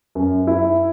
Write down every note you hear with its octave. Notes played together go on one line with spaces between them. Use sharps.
F#2
E4